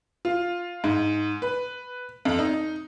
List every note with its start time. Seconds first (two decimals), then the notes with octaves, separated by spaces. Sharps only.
0.25 F4
0.84 G#2
1.42 B4
2.25 F2
2.39 D#4